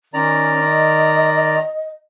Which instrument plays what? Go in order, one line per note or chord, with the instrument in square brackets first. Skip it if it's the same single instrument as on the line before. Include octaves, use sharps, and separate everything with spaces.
[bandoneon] D#3 D5 A#5 [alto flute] C#4
[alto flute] D#5